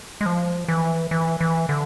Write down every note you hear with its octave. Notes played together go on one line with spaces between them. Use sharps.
G#3
F3
E3
E3
E3
D3